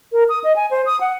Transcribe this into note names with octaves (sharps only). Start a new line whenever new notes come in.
A#4
D#6
D#5
G#5
C5
D#6
F#5